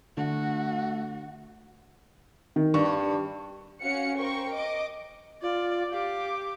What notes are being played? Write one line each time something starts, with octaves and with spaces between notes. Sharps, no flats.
D3 A3 D4 F#4
D#3
G2 C#6
C#4 F#4 F5 F#5 C#7
A#4 C5 G5 C#6
D#5 D6
F4 D5
G4 F5 D6